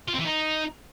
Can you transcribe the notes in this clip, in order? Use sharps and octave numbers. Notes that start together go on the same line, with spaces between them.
F4
C4
E3
D#4